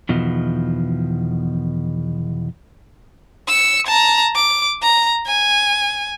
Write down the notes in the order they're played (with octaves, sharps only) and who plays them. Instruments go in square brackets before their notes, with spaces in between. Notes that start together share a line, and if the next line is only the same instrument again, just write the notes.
[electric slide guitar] E2 B2 D#3 F3
[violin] E6 C#7
A5 A#5
D6
A#5
G#5